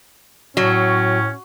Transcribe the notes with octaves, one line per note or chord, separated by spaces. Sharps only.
A2 F#3 C#4